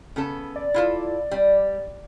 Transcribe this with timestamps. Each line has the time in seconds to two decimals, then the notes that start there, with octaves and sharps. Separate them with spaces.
0.16 C#3 B3 A4
0.56 D5
0.74 E4 F4 A4
1.31 G3